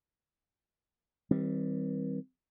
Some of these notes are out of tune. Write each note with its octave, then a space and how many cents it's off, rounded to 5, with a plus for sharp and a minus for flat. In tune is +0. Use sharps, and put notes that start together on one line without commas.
D#3 +45 G3 +0 C4 +0